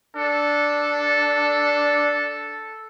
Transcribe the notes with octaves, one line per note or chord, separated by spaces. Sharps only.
D4 A4